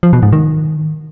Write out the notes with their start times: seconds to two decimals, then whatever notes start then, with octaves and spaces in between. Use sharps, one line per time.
0.03 F3
0.13 B2
0.23 G#2
0.32 D#3